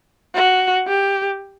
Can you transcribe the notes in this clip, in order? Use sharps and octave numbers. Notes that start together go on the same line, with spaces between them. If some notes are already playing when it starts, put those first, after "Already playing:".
F#4
G4